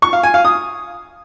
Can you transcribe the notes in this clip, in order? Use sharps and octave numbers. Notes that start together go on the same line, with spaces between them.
C#6
F5
G#5
F5
D#6